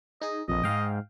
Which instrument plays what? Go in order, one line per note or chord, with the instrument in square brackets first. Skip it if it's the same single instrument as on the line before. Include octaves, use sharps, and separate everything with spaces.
[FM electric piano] D#4 G#4 [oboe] D#5
[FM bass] A#1 [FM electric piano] F2 [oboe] D#5
[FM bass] G#2 [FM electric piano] F5 G5